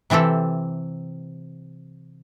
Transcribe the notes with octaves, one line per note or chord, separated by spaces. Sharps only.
C3 E3 C4 G4 A4